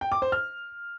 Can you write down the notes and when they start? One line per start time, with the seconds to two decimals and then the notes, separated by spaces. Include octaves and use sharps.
0.01 G5
0.12 D6
0.22 C5
0.32 F6